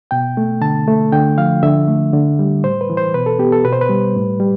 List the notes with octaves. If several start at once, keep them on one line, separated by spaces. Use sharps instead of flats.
B2 G5
A3
D3 A5
A3
D3 G5
F3 F5
D3 E5
A3
D3
G3
A2 C5
B4
E3
C5
B2 B4
A4
B3 G4
A4
B2 B4
C5
B4
G3
A2
G3